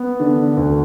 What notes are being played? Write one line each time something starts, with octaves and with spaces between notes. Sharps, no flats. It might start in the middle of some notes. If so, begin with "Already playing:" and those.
Already playing: B3
D3
D2